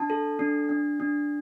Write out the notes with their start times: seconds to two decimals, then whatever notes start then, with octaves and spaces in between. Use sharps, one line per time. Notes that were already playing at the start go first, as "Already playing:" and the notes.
Already playing: D4 A5
0.10 A4
0.39 D4
0.69 D4
1.00 D4